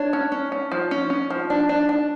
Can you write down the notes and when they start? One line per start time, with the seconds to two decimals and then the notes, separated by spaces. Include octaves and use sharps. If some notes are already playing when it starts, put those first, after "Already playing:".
Already playing: D4 C#5
0.13 C#4
0.32 C#4
0.52 C#4
0.72 F3
0.91 C#4
1.10 C#4
1.30 F3
1.50 D4
1.69 D4
1.89 D4